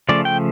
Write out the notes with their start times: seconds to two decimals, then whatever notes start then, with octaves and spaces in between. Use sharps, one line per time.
0.09 C#3 F3 A3 D5
0.25 G5